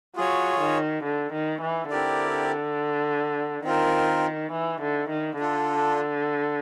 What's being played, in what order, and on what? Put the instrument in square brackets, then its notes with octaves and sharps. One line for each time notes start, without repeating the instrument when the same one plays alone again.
[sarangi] F#3 [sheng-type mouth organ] F4 G#4 C#5
[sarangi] D#3
D3
D#3
E3
[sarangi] D3 [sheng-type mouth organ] C4 E4 G4 A#4 D5
[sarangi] D#3 [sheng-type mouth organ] C4 F4 A#4
[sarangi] E3
D3
D#3
[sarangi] D3 [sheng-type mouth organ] D4 F4 A4